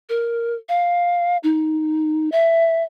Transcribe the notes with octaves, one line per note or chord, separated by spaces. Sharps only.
A#4
F5
D#4
E5